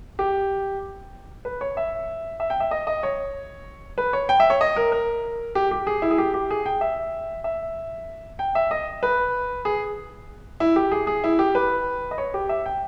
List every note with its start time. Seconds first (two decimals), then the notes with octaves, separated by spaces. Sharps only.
0.19 G4
1.45 B4
1.61 C#5
1.77 E5
2.40 E5
2.50 G5
2.60 E5
2.71 D#5
2.87 D#5
3.03 C#5
3.98 B4
4.13 C#5
4.29 G5
4.40 E5
4.50 C#5
4.61 D#5
4.76 A#4
4.92 A#4
5.55 G4
5.71 G4
5.87 G#4
6.02 E4
6.11 G#4
6.18 G4
6.34 G4
6.51 G#4
6.66 G5
6.81 E5
7.44 E5
8.39 G5
8.55 E5
8.71 D#5
9.03 B4
9.65 G#4
10.60 E4
10.76 G4
10.91 G#4
11.07 G#4
11.24 E4
11.39 G4
11.55 B4
12.11 D#5
12.18 C#5
12.34 G4
12.49 E5
12.66 G5